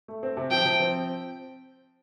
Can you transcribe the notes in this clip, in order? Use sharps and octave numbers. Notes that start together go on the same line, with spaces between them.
A3
C4
C3
F3 G5
F3
C4